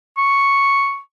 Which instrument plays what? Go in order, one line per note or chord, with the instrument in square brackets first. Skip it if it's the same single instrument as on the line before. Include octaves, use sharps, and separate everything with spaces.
[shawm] C#6